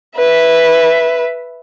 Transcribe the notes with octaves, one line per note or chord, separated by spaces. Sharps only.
B4 E5